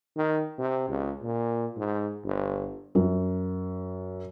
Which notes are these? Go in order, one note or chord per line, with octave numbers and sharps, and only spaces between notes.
D#3
C3
C#2
A#2
G#2
G1
F#2